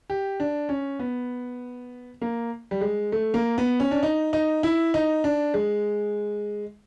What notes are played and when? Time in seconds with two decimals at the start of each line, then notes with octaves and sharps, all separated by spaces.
0.10 G4
0.40 D4
0.69 C#4
0.99 B3
2.22 A#3
2.71 G3
2.81 G#3
3.12 A3
3.34 A#3
3.58 B3
3.80 C#4
3.91 D4
4.03 D#4
4.33 D#4
4.63 E4
4.94 D#4
5.24 D4
5.54 G#3